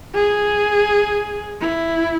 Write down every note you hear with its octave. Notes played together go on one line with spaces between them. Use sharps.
G#4
E4